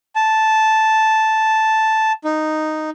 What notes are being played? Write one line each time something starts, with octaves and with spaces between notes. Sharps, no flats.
A5
D#4